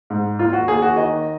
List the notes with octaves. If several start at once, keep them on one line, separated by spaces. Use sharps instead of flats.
G#2
D#2 F4
F#4
D#2 G#4
F#4
D#3 D#5